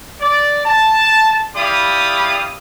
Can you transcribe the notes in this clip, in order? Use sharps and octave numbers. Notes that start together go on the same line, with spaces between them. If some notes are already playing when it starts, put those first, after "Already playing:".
D5
A5
E4 G4 D5 F5 B5 D#6